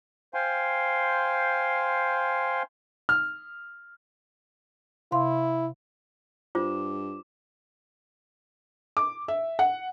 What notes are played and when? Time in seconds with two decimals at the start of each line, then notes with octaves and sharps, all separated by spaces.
0.34 C5 F5 G5 G#5 C6
3.09 F6
5.12 C3 E4 F5 C6
6.55 G2 F4 C5 D6
8.97 D6
9.28 E5
9.59 F#5